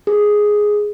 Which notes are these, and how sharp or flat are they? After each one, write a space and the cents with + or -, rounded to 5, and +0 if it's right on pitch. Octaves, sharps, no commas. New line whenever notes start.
G#4 +5